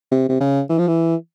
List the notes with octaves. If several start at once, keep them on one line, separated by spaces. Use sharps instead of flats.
C3
C3
C#3
E3
F3
E3